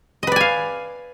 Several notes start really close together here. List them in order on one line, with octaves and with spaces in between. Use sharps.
D#5 B4 D5 G#5 F5